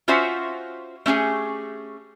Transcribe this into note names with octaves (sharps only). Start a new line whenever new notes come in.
C#4 F4 F#4 C5 E5 F#5
A3 C#4 G4 G#4